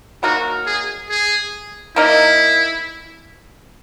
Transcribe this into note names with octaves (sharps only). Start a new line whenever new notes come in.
F#3 A#3 D#4 F#4 A#4
G#4
G#4
A#3 D#4 E4 A#4 D#5